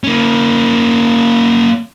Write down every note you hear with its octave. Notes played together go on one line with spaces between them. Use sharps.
A#3 C#4